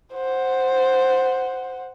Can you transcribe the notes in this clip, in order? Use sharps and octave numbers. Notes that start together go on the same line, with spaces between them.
C5 F#5